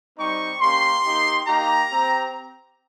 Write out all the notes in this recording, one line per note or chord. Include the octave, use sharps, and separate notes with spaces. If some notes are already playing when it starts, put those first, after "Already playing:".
G3 C4 D#4 G4 C#6
A#3 C#4 G4 C6
A#3 D#4 G4
A#3 D#4 G4 A#5
C4 G4